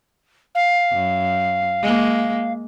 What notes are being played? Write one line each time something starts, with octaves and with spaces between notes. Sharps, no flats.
F5
F#2
G#3 A#3